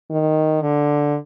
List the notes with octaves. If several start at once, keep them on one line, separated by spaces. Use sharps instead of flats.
D#3
D3